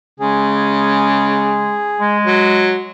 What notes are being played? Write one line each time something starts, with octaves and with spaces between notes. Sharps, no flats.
C#3 G#3 G#4
G#3
F#3